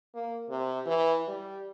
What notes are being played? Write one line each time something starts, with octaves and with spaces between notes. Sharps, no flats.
A#3
C3
E3
G3